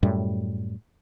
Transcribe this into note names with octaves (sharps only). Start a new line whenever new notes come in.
F#2 A2 G3